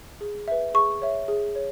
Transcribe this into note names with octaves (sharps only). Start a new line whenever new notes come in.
G#4
B4 E5
G#4 C#6
C#5 E5
G#4
C#5